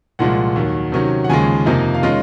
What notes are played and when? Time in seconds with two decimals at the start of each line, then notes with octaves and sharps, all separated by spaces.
0.19 C2 A#2 F3 G#3 F#5
0.56 D#2 D#3 F#3
0.92 C3 D#3 F#3 C#4
1.24 F#5
1.29 D#2 C#3 F3 G#3 G#5
1.66 F2 C3 F3 A#3 D#4
1.94 F5
2.03 D#3 G#3 C#4 F4 D#5